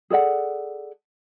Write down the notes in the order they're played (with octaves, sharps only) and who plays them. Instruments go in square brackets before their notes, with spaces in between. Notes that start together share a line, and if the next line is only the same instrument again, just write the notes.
[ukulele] G#4 A4 D5 F#5